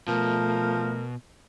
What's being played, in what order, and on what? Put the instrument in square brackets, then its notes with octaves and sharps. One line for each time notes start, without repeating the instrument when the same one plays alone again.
[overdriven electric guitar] B2 [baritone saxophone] F3 [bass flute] A3 [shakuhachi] A#4